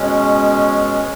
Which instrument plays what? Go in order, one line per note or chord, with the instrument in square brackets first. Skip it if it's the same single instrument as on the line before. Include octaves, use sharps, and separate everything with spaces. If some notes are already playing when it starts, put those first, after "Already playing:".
Already playing: [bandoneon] B2 G#3 C#4